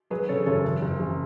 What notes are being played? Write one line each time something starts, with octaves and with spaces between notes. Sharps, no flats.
F#3 G#4 B4
C#3 A4 C#5
F#1 A4 C#5
F#1
F#1
F#1